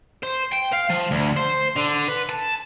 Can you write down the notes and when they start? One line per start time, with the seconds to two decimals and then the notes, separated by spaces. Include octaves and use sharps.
0.23 C5
0.53 G5
0.73 F5
0.90 F3
1.11 D2
1.36 C5
1.76 D3
2.08 B4
2.29 A5